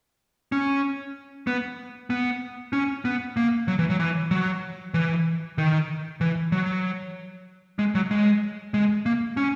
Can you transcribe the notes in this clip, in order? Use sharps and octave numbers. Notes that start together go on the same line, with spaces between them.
C#4
B3
B3
C#4
B3
A#3
F#3
E3
F#3
E3
F#3
E3
D#3
E3
F#3
G#3
F#3
G#3
G#3
A#3
C#4